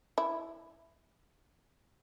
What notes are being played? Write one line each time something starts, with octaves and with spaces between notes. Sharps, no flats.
E4